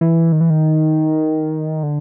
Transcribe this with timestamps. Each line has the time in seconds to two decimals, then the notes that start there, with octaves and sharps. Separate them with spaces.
0.01 E3
0.32 D#3
0.41 E3
0.50 D#3
1.83 D3